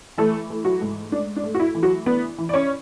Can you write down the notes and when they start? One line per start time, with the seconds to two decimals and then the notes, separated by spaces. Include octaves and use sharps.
0.18 E3 A3 A4
0.50 A3
0.65 F#3 F#4
0.82 G#2
1.12 D4
1.36 D4
1.44 A3
1.55 F#4
1.60 E4
1.75 E3
1.83 F#3 F#4
2.06 B3 D4 B4
2.38 E3
2.49 D5
2.54 C#4 C#5